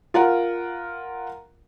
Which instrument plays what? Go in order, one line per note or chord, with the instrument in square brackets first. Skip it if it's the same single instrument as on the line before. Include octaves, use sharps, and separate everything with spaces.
[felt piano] F4 A#4 F#5